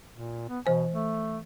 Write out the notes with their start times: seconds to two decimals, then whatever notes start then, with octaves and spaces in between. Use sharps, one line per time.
0.12 A#2
0.49 B3
0.66 B2 E3 C5 G#5
0.92 A3